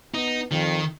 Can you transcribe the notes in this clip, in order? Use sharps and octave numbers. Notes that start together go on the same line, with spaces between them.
B3 D#4
F2 D#3